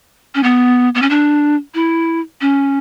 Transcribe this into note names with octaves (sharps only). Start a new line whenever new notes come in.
C#4
B3
B3
C#4
D4
E4
C#4